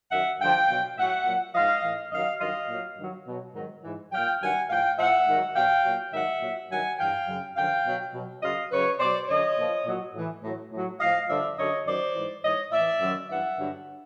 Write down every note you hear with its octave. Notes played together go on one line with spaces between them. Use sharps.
F#2 D#3 F#3 E5 F#5
G2 D3 F3 F5 G5
B2 F#3
A2 F#3 E5 F#5
A#2 F#3
G#2 F3 D#5 F5
A2 E3
F#2 D#3 F#3 D#5 F5
G2 D#3 F#3 D#5 F5
A#2 F#3
G2 D#3 F#3
B2 F#3
G#2 D#3 F#3
G#2 E3
A#2 F#3 F5 G5
G2 D#3 F#3 F#5 G#5
A2 F3 F5 G5
A2 F3 E5 F#5
G#2 D#3 F#3
B2 F#3 F5 G5
A#2 F#3
G#2 D#3 F#3 E5 F#5
A#2 F#3
G2 D#3 F#3 F#5 G#5
G2 E3 F5 G5
F#2 C#3 F#3
F#2 D3 F3 F5 G5
B2 F#3
B2 F#3
F#2 C#3 F#3 D#5 F5
F#2 C#3 F#3 B4 C#5
B2 F#3 C5 D5
F#2 D3 F#3 C#5 D#5
A#2 F3
A#2 F#3
A2 E3
A2 F#3
A2 F#3
A2 F3 D#5 F5
G2 D3 F3 D5 E5
F#2 D3 F#3 C#5 D#5
F#2 D#3 F#3 C5 D5
G#2 E3
G#2 E3 C#5 D#5
A2 E3 D5 E5
F#2 D#3 F#3
G2 E3 E5 F#5
G2 D3 F#3